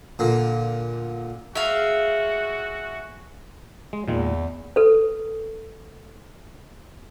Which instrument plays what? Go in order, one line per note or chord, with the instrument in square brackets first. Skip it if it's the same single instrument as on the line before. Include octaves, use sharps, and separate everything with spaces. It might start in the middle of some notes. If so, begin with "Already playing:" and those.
[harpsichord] A#2 D3
[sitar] G#3 [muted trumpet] F#4 [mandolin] E5 F5
[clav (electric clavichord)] G#3
[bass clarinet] E2 [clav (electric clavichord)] A#2 D#3 G#3
[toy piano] A4 B4